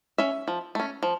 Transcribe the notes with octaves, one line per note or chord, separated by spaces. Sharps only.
C#4 E5
F3
A3 C#4
F3